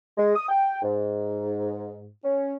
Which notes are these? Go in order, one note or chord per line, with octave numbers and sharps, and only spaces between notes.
G#3
D#6
G5
G#2
C#4